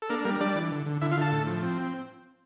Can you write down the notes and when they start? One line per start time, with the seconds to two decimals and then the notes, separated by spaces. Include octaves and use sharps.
0.02 A4
0.10 A#3 D4 A#4
0.25 G3 A#3 A#4
0.41 G3 D4 D5
0.56 E3
0.72 D3
0.86 D3
1.01 D3 E4 E5
1.11 F4 F5
1.17 D3 A4 A5
1.32 A2
1.47 F3
1.62 C4